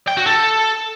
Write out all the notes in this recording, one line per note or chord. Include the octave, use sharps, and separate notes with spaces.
G5
F#4
A4